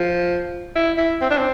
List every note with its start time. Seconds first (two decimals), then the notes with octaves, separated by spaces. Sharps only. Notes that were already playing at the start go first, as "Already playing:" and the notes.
Already playing: F3
0.75 E4
0.98 E4
1.21 C4
1.30 D4
1.38 C4